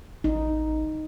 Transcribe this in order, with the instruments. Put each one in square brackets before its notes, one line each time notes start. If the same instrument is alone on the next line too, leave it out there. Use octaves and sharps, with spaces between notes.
[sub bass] A1 [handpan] D#4